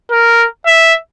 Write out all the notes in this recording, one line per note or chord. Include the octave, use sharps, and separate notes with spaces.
A#4
E5